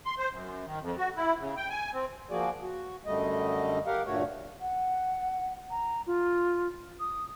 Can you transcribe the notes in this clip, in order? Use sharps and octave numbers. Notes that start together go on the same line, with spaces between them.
C6
C5
F#2
D#3
F2
F#4
E4
C#3
G5
G#5
C4
F3 A#3 F#4 G#4 D5
F#4
F#2 D3 G3 A3 D#5
G4 A#4 F5 F#5
D2 G2 A#2 A3 F#4 C#5
F#5
A#5
F4
D#6